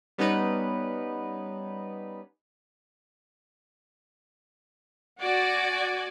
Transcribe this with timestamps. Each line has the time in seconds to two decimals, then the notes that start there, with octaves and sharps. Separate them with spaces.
0.18 G3 B3 C#4 D#4 B4
5.20 F#4 D5 G#5